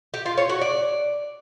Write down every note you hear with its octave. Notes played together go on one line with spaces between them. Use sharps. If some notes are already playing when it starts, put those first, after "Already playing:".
G4
F4
C#5
F#4
D5